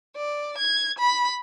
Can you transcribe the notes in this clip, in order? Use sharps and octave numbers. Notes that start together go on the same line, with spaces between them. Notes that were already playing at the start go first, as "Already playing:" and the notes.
D5
G#6
B5